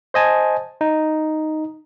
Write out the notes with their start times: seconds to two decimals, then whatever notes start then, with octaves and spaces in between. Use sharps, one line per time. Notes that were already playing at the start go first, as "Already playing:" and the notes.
0.14 C5 D#5 G#5 A5
0.81 D#4